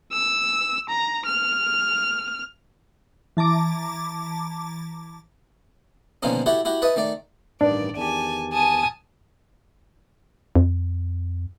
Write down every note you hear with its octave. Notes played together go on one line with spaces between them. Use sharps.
E6
A#5
F6
E3 A5 A#5 D6
B2 D3 D#3 F3 A#3 C#4
E4 F#4 G4 A4 C#5 E5
E4 F#4 G4
B4 C#5 D#5 E5 A5
D#3 A3 D5
A1 G2 D#3 D4 D5
E2 D#3 G4 G#5 A5
G#5 A5 D#6
F2